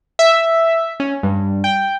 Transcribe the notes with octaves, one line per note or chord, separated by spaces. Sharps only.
E5
C#4
G2
G5